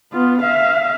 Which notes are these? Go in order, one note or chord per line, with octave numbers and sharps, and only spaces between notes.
B3 F4
E5 F5